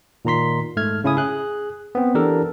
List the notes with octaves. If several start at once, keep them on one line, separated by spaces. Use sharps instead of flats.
A#2 D#3 A#5 C6 B6
G#2 A3 F6 G#6
C#3 C#4 E4 G#5 D#6
G#4 F#6
B3 C4
E3 D4 G4 A4 A#4